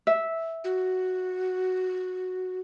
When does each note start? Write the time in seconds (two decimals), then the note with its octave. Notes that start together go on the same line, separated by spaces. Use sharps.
0.07 E5
0.64 F#4